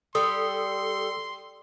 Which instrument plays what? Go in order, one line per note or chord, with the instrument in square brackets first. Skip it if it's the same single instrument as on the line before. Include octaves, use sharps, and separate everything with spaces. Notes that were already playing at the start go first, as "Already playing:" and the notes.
[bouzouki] G3 [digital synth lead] A4 [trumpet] C6 [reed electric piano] D#6